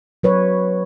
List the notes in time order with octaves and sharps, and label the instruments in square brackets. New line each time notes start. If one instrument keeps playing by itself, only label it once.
[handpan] F#3 B4 C#5